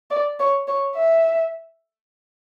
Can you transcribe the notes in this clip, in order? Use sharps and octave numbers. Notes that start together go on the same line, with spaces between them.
D5
C#5
C#5
E5